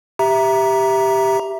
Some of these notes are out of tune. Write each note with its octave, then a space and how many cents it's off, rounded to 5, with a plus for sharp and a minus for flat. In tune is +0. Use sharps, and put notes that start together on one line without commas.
G4 +0 E5 +0 A#5 +10